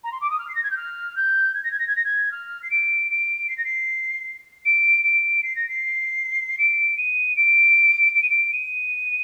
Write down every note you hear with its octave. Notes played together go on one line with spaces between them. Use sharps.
A#5
C6
D6
D#6
F6
C7
A#6
G#6
G6
F6
G6
G#6
A#6
G#6
A#6
G#6
A#6
G#6
F6
C7
D7
D7
C7
A#6
C7
D7
D7
C7
A#6
C7
D7
D#7
D7
D7
D#7
D7
D#7